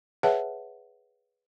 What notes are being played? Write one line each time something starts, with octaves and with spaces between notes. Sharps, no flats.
G#4 B4 C#5 E5 F#5 A5